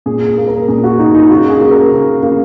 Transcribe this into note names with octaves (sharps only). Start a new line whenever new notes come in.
A#2 G#4
G#4
A#3
A#4
A#2 G#4
F#4
A#3 D#4
D#4
C#3 F#4
G#4
A#3
A#4
C#3
A#3